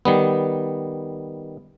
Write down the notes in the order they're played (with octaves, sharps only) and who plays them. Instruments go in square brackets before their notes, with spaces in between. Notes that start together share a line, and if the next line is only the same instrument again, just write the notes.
[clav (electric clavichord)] D#3 G3 B3